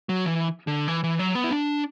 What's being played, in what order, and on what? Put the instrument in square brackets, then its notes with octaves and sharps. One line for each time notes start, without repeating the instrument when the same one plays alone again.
[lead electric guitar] F#3
E3
D3
E3
E3
F#3
B3
E4
D4